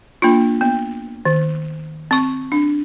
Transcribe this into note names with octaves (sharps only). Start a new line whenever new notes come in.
A#3 D4 F4
B3
D#3
C4 C#6
D4